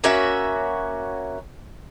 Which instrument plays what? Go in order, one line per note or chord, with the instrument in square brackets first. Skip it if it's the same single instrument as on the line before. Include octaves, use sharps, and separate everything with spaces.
[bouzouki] A#3 C#4 F#4 E5